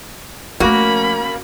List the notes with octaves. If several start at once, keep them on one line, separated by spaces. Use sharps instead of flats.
F3 A3 A#3 C#4 F#4 A#4 B5